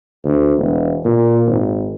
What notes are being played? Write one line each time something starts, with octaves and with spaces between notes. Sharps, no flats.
D2
E1
A#2
G#1